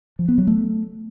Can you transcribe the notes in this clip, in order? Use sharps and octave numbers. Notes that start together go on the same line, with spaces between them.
F3
B3
F#3
A3